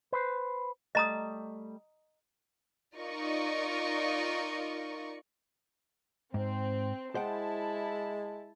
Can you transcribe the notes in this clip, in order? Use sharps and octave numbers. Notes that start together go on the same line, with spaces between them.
B4 C5
G3 A3 D#5 A#5 D#6
D#4 F4 A#4 D5 D#5 C#6
G#2 C4
G#3 E4 C5 F#5 G5 A5